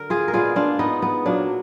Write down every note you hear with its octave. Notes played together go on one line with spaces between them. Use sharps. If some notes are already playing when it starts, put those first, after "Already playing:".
Already playing: D3 A#4
F4 G#4
A#4
A#2 G#3 B3 F4 G#4
D4 F4
B3 D#4
B3
A#2 F#3 A#3 D4